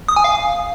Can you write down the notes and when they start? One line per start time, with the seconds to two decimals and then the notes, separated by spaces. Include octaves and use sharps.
0.09 D#6
0.16 G#5
0.24 F5